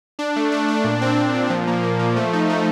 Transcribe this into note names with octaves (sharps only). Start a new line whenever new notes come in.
D4
A3
D4
D4
A#2
C4
C4
A#2
F3
A#3
F3
F3
A3
D#4
A3